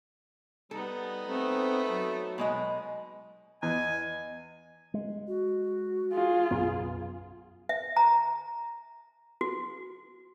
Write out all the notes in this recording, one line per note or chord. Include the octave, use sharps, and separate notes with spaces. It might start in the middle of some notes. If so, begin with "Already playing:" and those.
G3 B3 D#4 A4
A3 C4
F#3
B2 G#3 D#5
E2 D#5 G#5
G#3
F#4
F4 G#4
B1 F#2 B3
E5
A#5
F#4